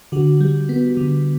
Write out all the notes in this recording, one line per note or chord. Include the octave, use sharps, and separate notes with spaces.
D3 F#4
G3
B3
D3